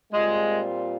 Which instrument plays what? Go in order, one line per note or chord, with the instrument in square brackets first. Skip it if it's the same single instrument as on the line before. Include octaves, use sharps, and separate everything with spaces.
[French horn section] A#2 G3 C4 F4 [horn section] G#3